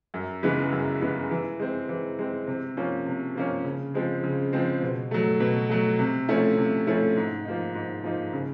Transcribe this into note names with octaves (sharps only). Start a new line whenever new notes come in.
F#2
C#3 E3 G#3 B3
F#2
C#3 E3 G#3 B3
E3
G#3 C4
E3
G#3 C4
C3
F3 A#3 C#4
C3
F3 A#3 C#4
C#3
F3 G#3 C4
C#3
F3 G#3 C4
B2
F#3 A3
B2
F#3 A3
C3
F3 A3 C#4 E4
C3
F3 A3 C#4 E4
G#2
F3 A#3 D#4
G#2
F3 A#3 D#4
C#3